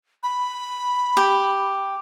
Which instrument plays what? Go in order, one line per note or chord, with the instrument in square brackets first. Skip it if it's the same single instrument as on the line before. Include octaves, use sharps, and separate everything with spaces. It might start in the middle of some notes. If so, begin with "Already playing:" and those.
[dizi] B5
[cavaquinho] G4